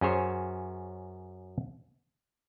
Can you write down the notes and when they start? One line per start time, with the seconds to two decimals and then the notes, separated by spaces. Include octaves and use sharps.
0.01 F#2 C#4 G#4 C5 C#5